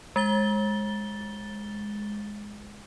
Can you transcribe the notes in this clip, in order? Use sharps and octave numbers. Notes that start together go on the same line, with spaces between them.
G#3 A6 G7